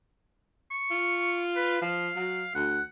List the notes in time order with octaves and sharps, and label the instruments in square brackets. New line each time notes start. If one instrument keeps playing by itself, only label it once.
[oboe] C#6
[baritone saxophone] F4
[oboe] B4
[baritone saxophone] F3 [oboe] F5
[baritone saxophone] F#3
[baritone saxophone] D2 [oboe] F#5